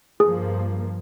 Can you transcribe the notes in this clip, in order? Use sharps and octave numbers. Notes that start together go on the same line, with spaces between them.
G2 F3 A#3 G#4